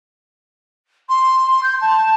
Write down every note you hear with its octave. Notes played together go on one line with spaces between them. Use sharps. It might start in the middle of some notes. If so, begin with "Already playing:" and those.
C6
C6
G6
A5